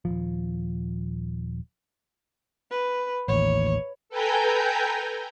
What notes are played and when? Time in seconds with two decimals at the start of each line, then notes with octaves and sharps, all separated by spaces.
0.05 D#1 C2 F3
2.71 B4
3.28 A1 D#2 C#5
4.09 A4 B4 G5 G#5 A#5 G6